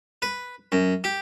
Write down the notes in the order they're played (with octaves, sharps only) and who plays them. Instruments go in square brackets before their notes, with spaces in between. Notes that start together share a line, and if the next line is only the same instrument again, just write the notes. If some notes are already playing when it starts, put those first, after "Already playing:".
[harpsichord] B4
F#2
G4